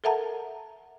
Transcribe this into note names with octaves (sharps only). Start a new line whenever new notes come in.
A4 A#4 E5 F#5 A5 A#5